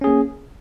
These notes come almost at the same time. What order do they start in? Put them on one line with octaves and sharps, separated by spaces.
C#4 G#4 A#3